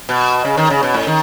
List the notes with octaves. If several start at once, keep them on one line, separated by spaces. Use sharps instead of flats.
B2
C#3
D#3
C#3
B2
A2
D#3